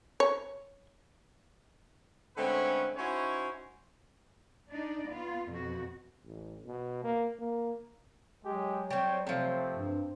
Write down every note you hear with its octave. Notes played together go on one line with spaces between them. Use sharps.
C#5
D3 G#3 A3 C4 C#4 B4
C#4 D#4 E4 F#4 C5 C#5
D4 D#4 D5
B3 F4
F2 B2 F#4
A1
B2
A#3
A#3
F#3 G#3 G4
G3 C4 C#5 G5
C3 F3 A3 C4
G2